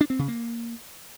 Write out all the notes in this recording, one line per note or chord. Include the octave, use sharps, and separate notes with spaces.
D4
C4
C#3
A#3